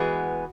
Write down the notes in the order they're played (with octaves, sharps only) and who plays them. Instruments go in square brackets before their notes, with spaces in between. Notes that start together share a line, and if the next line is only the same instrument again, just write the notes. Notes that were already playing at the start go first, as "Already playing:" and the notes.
Already playing: [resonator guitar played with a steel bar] E3 G#3 B3 G#4 [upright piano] F#4